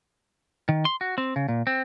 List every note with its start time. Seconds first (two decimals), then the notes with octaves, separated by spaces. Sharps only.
0.69 D#3
0.85 C6
1.01 F#4
1.18 C4
1.36 C#3
1.48 A#2
1.67 C4